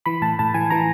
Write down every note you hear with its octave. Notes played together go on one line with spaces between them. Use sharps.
E3 B5
A2 A5
A2 A5
E3 G#5
E3 A#5